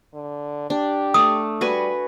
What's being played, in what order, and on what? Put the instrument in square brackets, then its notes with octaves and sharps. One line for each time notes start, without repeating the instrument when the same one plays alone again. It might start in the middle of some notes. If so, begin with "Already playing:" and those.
[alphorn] D3
[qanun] D4 [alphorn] G4
[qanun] A3 D5 [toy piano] D#6
[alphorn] G3 [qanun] F#4 B4 G#5